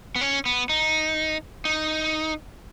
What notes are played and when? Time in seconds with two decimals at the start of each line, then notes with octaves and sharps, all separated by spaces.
0.16 B3
0.21 C#4
0.46 B3
0.69 D#4
1.65 D#4